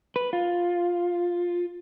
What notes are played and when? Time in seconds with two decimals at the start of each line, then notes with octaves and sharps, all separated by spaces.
0.16 B4
0.33 F4